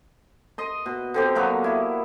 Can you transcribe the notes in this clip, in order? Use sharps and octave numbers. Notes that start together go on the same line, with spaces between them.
D#5 C6
B2
D3 C4 G4
F#3 A#3 B3
E4